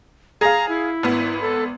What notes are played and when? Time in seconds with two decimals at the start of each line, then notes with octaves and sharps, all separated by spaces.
0.41 G#4 F5 A#5
0.69 E4
1.03 G#1 B3
1.41 A4